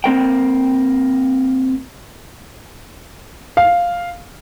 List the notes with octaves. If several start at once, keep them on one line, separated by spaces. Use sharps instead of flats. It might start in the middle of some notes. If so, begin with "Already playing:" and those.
A#3 C4 A#4 G5
F5